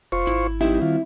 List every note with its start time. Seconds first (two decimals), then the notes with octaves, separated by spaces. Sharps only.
0.12 F1 F4 C5 C#6
0.27 G#1 E4
0.61 G3 C4 D#4 E4 G4 E5
0.82 D#3 F4